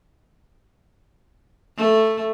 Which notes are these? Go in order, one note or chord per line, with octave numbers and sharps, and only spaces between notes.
A3